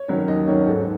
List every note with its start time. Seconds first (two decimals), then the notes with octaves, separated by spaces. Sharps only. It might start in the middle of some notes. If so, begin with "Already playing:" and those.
Already playing: C#5
0.08 D#3 F#3 C#4
0.28 D#2 D#5
0.47 D#3 F#3 C#4 C#5
0.67 G#2 A4